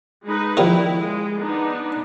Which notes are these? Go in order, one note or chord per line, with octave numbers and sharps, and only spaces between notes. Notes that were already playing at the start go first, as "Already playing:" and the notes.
G#3 D#4 B4
D#3 F3 G3 E4
G#3
B3 D4 D#4